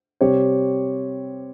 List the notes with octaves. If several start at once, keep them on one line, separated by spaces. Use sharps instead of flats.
C3 G3 C4 G4 C#5